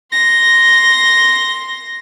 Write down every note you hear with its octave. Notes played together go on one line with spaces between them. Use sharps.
C6 A#6